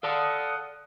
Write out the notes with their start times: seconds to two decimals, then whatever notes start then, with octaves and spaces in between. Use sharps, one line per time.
0.03 A4 D5 F5 F#5 A5 D#6